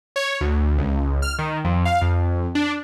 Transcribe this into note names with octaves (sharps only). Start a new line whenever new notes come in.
C#5
D2
C#2
F6
D#3
F2
F5
F2
D4